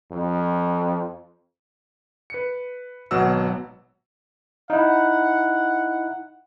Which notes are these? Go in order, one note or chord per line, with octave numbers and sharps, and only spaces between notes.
F2
B4 C#7
G#1 B2 F#3 F#5 E6
D#4 E4 F#5